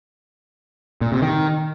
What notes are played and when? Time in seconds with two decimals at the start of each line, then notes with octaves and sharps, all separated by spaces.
1.01 A#2
1.12 C3
1.22 D#3